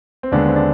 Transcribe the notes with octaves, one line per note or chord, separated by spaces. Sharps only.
C4
D#2 D3 G#3 B3 D4
C4
D4